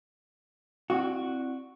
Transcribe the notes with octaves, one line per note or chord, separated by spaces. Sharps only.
C4 E4 F#4 D5